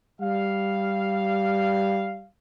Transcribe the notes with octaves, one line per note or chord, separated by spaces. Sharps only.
G3 F5